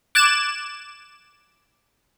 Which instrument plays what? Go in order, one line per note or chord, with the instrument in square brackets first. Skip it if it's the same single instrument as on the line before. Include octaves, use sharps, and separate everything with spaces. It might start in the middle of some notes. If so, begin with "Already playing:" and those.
[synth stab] D6 F#6 G#6 A6 E7